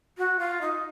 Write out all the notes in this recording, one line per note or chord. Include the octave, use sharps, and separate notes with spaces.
F#4
F4
D#4